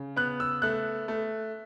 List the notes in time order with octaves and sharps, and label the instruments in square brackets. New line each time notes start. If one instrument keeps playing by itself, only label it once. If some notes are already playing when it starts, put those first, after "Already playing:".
Already playing: [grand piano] C#3
B3 F#6
E6
A3 F#6
A3